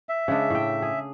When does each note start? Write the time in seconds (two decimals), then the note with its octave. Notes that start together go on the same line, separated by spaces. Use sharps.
0.09 E5
0.28 C#3 G#3 D4
0.50 A2 G5
0.82 G#4